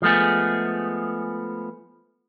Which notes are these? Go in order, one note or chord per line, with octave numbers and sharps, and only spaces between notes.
F3 G#3 A3 B3 G#4